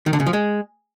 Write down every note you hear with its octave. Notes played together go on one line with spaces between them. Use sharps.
D#3
D3
C#3
F3
G#3